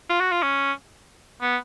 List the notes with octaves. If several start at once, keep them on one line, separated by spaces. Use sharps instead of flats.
F4
F#4
F4
C#4
B3